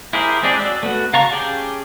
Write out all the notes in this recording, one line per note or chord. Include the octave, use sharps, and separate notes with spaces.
E4 G4 G#4 A#4 C5
G#3 C4 D4 G4 G#4
F#3 D5 E6
A3 B3 F#4
C#3 F5 A5 A#5 C#6
C#4 G4 G#4 G5 A5